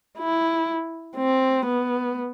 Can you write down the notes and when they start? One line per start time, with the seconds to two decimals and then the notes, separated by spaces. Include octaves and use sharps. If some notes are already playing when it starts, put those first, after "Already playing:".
0.18 E4
1.17 C4
1.66 B3